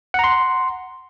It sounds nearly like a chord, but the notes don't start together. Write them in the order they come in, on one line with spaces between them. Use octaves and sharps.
F#5 A#5 C6